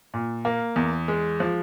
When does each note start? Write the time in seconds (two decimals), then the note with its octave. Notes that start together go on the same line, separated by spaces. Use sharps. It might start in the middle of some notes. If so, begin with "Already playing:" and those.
0.14 A#2
0.45 A#3
0.76 E2
1.08 G#3
1.40 F3